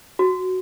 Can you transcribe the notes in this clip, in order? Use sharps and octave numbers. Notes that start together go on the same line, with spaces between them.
F#4